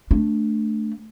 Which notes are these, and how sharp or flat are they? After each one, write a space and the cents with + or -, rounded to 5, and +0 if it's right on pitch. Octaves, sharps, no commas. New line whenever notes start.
A3 +0 D4 +0